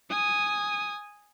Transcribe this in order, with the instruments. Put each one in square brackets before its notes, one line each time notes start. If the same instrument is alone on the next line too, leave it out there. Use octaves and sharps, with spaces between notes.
[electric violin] G#5 D#6